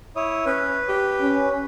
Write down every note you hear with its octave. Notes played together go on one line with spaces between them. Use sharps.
E4 C#5 D#6
C#4 B4
G4
C#4